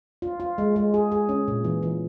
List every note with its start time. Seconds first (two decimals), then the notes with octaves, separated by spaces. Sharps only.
0.22 F4
0.40 F4
0.58 G#3
0.76 G#3
0.94 G#4
1.12 G#4
1.29 C#4
1.48 A#2
1.64 E3
1.83 E3